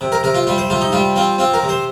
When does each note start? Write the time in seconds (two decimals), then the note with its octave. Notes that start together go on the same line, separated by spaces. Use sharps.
0.01 C3
0.12 A#4
0.23 C3 A#4
0.34 F4
0.47 G3 F4
0.58 C5
0.70 C3 F4
0.81 D#4
0.92 G3 F4
1.16 C4 F4
1.38 C4 F4
1.54 A#4
1.63 C3
1.69 C5